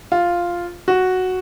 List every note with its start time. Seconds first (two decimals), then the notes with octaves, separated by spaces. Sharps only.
0.12 F4
0.88 F#4